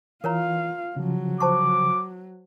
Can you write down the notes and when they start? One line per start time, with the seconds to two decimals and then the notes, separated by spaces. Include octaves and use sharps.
0.24 E3 F4 A#4 C#5 F5 A#5
0.96 C#3 F3 F#3
1.40 C5 A5 C#6 D6